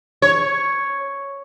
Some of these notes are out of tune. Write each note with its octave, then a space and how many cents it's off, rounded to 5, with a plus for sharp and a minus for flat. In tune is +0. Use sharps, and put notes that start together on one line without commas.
C#5 +0